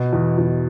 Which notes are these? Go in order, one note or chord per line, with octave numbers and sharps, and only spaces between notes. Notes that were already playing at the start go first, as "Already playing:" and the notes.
Already playing: B2
E2
E2